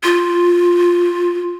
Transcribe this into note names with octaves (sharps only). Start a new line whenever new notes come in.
F4